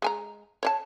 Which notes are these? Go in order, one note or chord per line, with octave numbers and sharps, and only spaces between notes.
G#3 G#5 A#5
C#5 D5 A5